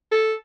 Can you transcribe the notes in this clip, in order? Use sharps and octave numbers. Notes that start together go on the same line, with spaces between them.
A4